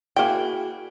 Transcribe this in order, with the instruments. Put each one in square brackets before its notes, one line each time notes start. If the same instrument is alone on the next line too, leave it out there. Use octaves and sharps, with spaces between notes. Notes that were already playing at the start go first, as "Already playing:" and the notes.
[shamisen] A#3 G5 [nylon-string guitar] E4 F#4 G#4